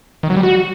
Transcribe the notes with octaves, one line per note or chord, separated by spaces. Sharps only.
D#3
F#3
G3
F#4